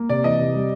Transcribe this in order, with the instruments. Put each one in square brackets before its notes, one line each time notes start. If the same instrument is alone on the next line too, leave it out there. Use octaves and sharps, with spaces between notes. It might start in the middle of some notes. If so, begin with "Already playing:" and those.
Already playing: [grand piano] A#3
[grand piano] C3 [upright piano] D5
[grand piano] E3 [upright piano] D#5
[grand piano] C3
G3